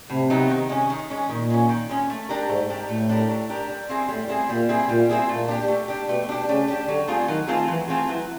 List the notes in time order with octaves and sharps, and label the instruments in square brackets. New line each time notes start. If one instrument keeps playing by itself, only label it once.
[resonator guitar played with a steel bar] A2 [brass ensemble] C3
[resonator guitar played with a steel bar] F#3 B3 D#4
D#3
G#3 C#4
D#3
G#3 C#4
[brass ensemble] A#2 [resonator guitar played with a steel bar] D#3
[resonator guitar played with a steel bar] G#3 C#4
D#3
G#3 C#4
A3
D4 G4 A#4
[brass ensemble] G#2 [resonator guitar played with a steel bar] A3
[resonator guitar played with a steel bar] D4 G4 A#4
[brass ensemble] A2 [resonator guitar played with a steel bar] A3
[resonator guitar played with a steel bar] D4 G4 A#4
A3
D4 G4 A#4
G3
C4 E4 G#4
[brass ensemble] A2 [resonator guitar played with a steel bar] G3
[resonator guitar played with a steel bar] C4 E4 G#4
[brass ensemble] A#2 [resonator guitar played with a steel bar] G3
[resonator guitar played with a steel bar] C4 E4 G#4
[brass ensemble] A#2 [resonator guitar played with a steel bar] G3
[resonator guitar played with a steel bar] C4 E4 G#4
[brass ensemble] A#2 [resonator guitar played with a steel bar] A3
[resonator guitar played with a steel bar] D4 G4
A3
D4 G4
[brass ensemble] B2 [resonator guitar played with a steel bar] A3
[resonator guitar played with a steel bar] D4 G4
[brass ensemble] C#3 [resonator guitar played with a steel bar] A3
[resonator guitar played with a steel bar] D4 G4
[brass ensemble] D3 [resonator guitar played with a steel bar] F#3
[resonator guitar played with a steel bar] A3 C4 F4 G#4
[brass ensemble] D#3 [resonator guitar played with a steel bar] F#3
[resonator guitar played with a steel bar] A3 C4 F4 G#4
[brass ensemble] E3 [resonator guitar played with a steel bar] F#3
[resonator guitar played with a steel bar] A3 C4 F4 G#4
[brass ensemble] E3 [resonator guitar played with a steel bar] F#3